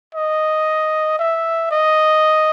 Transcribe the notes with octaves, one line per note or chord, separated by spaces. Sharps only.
D#5
E5
D#5